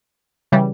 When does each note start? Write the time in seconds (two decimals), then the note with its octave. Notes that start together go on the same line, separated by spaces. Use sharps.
0.52 C#3 E3 G3